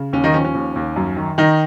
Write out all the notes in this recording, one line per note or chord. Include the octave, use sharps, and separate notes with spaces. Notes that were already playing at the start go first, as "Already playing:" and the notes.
Already playing: C#3
D#2 C#4
D#3 D#4
F3 C#4
C#4
D#2
D#2
F#2
D#3
D#3 D#4